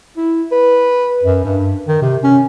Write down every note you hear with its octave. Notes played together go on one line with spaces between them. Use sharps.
E4
B4
F#2
G2
D#3
C3
C#4